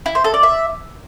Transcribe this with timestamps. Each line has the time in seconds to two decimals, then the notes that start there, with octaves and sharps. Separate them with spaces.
0.06 E4
0.15 C5
0.24 A4
0.34 D5
0.43 E5